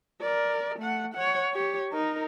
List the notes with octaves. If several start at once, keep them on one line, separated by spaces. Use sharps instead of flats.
A#4 D5
A3 F#5
C#5 F#5
G4 C#5
D#4 A#4